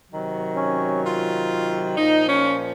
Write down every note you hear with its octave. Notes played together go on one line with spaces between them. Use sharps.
C3 D#3 F#3
C#4
F4
A#2 F3 D#4
C#4